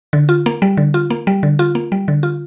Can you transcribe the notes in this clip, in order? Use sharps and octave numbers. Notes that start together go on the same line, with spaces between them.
D3
F4
A#3
G3
D3
F4
A#3
G3
D3
F4
A#3
G3
D3
F4